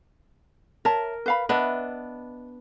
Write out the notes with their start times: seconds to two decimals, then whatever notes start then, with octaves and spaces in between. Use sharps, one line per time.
0.85 A#4 C#5 E5 A5
1.26 B4 F5 B5
1.49 B3 D4 D#5 E5